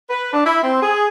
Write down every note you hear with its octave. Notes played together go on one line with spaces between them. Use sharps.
B4
D4
E4
C4
G#4